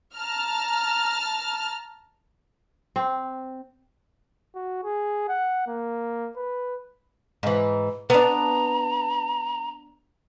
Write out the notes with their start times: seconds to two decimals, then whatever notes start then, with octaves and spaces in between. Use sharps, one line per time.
0.15 A5 A#5 F6
2.96 C4
4.55 F#4
4.84 G#4
5.29 F#5
5.67 A#3
6.37 B4
7.43 G#2 E3
8.10 B3 D4 A#5